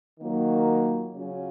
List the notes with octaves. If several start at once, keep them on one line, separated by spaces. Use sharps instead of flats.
D#3 F#3 A#3 F4
C#3 F#3 C#4 F4